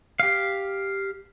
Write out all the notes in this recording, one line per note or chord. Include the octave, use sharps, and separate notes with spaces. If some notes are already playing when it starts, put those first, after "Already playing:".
G4 F5